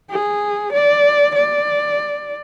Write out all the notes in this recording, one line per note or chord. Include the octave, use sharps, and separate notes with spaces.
G#4
D5
D5